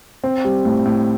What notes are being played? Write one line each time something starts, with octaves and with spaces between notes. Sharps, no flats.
C4
G3
A2
A2